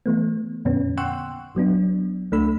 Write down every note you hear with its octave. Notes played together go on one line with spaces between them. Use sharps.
E3 A3 B3
F2 A#2 D3 B3 C#4
F#5 G5 C6 C#6 E6 F#6
G1 F#3 B3 D4
C#2 A3 D4 B5 E6